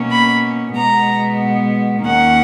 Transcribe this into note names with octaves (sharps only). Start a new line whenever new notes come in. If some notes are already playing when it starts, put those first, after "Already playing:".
Already playing: B2 A#3 C#4
B5
B2 G#3 B3 A#5
D#2 D#3 A#3 C#4 F#5